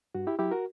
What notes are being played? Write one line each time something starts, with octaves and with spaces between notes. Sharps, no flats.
G2 F#4
E4 G4
F#3 E4 G4
F#4 A#4